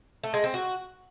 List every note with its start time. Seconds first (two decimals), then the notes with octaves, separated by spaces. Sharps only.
0.24 A3
0.34 G#3
0.44 C4
0.54 F#4